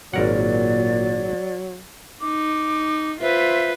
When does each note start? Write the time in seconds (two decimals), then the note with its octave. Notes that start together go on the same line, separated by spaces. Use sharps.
0.14 G#1 A#2 F#3 A#4 D5 F#5
2.22 D#4 D6
3.21 F4 B4 C5 E5